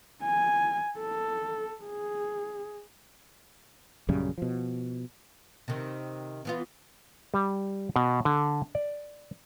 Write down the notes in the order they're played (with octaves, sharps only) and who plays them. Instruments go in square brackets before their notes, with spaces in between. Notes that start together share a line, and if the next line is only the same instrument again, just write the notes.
[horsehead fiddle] G#5
A4
G#4
[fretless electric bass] A#1 F#2 C#3 G3
B2 F3
[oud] C3 D#3
E3 B3 F4
[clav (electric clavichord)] G3
B2
D3
D5